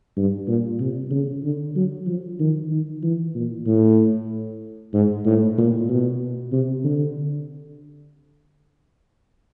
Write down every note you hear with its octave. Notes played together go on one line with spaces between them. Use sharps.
G2
A#2
C3
C#3
D3
F#3
F3
D#3
D#3
E3
A#2
A2
G#2
A2
A#2
B2
C3
D3